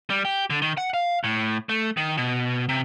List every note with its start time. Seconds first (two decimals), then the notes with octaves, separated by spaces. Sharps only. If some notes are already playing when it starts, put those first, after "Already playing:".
0.10 G3
0.25 G4
0.50 D3
0.62 D#3
0.77 F#5
0.94 F5
1.24 A2
1.69 A3
1.97 D#3
2.17 B2
2.69 C3